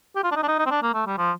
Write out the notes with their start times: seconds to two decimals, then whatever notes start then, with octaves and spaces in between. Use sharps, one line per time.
0.16 G4
0.24 F4
0.32 D4
0.36 D#4
0.43 D4
0.48 D#4
0.59 D#4
0.66 C4
0.71 D4
0.83 A#3
0.94 A3
1.07 G3
1.18 F3